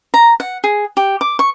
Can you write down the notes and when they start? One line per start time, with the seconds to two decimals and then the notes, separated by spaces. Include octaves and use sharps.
0.14 A#5
0.40 F#5
0.64 G#4
0.97 G4
1.21 D6
1.39 C#6